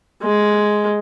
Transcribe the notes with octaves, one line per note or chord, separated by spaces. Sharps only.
G#3